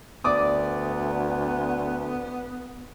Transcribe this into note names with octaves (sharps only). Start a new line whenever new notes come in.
D2 B3 D5 D6 D#6